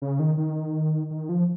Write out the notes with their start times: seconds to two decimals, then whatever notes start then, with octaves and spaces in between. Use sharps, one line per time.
0.02 C#3
0.19 D#3
0.38 D#3
1.11 D#3
1.29 F3